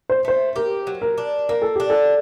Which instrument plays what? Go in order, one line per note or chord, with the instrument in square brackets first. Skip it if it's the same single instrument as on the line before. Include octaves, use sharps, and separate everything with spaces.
[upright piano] C5
[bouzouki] A3 [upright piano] C5
[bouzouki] G4 [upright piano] A#4
[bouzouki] F#3
[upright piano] A#4
[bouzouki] D4
[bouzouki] A#3 [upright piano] A#4
[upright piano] A4
[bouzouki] D4 [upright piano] G4
[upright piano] A4